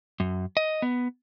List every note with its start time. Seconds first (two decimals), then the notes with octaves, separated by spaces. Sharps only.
0.20 F#2
0.57 D#5
0.82 B3